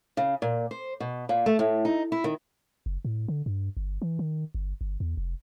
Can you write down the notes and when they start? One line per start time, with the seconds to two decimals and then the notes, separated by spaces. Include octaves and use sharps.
0.17 C#3
0.42 A#2
0.71 C5
1.00 B2
1.29 A#2
1.46 A3
1.59 A2
1.85 D#4
2.12 E4
2.24 D#3
2.86 F#1
3.05 A2
3.28 D3
3.46 G2
3.77 G1
4.02 E3
4.19 D#3
4.54 G1
4.81 G1
5.00 E2
5.17 F1